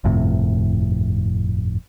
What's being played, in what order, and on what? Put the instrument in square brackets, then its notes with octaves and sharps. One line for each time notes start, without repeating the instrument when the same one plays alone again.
[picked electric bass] G1 F2 A2 C3